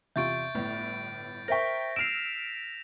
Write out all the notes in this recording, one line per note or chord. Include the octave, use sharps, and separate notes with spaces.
E2 C3 F4 E5 C#6 G6 A6 D7
G1 A2 B3
A#4 C5 E5 G5 C#6 A#6 B6
E6 F6 C7 D7 E7 F7